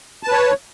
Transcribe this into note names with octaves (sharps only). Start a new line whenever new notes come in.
B4 C#5 A5